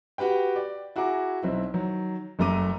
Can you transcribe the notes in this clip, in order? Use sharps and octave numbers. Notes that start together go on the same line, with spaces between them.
F#4 G4 B4 G5
D5
E4 F#4 G#4 A#5 D6
B1 C4 E4
D#3 F#3
F#1 F#2 A3 A#5 D6 D#7